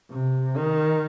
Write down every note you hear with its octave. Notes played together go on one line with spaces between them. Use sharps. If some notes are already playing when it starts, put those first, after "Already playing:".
C3
D#3